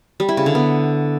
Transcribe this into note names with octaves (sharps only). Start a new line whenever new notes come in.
G3
E4
C#3
D3
B3